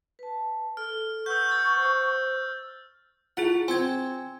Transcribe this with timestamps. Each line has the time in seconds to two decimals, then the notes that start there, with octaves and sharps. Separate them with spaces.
0.19 B4 A5
0.77 A4 F6
1.26 B4 F#5 C#6 E6 G6
1.49 E6 G6 A6
1.76 C5
3.37 E4 F4 G#4 F#5
3.68 C4 G#5 G#6